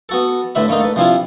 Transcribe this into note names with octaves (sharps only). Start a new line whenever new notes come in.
B3 F#4 A4
A2 D3 B4 E5 B5
D3 A3 A#3 D#4
A4 B4
C3 F3 D4 E4 F4